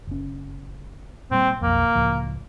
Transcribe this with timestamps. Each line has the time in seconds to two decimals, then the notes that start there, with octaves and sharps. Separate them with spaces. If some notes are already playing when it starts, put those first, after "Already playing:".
0.07 F#1 C#4
1.31 A#2 G3 C4
1.61 B1 F2 A#3
1.95 C#2 A2 F3